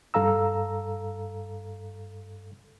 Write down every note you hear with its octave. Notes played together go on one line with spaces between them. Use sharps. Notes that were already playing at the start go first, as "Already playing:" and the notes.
G2 A4 F5 A#5 E6